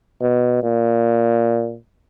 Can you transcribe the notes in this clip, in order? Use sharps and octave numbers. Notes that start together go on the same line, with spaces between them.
B2
A#2